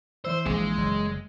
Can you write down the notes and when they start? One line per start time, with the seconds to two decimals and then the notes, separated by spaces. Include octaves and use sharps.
0.25 E3 C5 E6
0.46 A#1 G#3
0.78 F#1